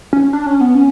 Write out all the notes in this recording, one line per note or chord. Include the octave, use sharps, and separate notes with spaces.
C#4
D4
C#4
B3
C#4